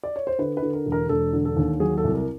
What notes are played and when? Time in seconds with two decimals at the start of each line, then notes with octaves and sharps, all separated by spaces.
0.03 D5
0.16 C#5
0.27 C5
0.39 D3 B4
0.57 B4
0.62 D3
0.73 A#4
0.86 E1
0.92 A#4
1.09 E1 A4
1.33 D3
1.45 A4
1.57 D#2
1.80 F#3 G#4
1.98 A4
2.04 C2
2.15 A#4